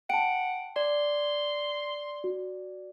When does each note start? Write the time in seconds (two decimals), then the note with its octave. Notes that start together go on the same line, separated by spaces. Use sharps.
0.10 F#5 G5 A5 D7
0.76 D5 C6
2.24 F#4